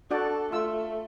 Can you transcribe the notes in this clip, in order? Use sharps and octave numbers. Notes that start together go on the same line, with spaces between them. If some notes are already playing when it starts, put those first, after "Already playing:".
D4 F#4 A4 D5
A3 F4 E6